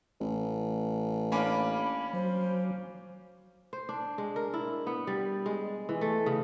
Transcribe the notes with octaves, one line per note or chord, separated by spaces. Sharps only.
A1
A#3 C#4 D4 B5
F#3 C5
C5
D4
G#3
A#4
E4
B3
G3
G#3
E3
A3
C#3